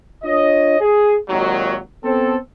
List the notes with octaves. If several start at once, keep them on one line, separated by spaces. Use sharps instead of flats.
D4 F4 C#5 D#5
G#4
G#1 D#2 A#2 D#3 F#3
B3 C4 A4